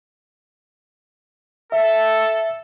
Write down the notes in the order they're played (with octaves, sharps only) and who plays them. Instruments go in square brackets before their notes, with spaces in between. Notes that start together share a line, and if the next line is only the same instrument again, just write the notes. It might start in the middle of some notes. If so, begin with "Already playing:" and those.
[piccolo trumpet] A4 [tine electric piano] E5